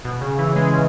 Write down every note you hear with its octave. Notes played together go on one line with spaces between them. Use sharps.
B2
C#3
E3
G#3
C#3